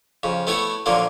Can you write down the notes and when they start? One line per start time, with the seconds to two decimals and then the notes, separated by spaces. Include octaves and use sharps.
0.23 F2 C#3
0.47 A3 B3 E4 F#4 C#5
0.86 A#2 D3 F3 F#3 A#3